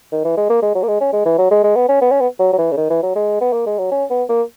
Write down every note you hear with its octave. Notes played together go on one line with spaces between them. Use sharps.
D#3
E3
G#3
A#3
G#3
F#3
A#3
G#3
C#4
G#3
E3
F#3
G#3
G#3
B3
C#4
B3
C#4
B3
F#3
F#3
E3
C#3
D#3
E3
F#3
G#3
B3
A#3
G#3
F#3
C#4
B3
A#3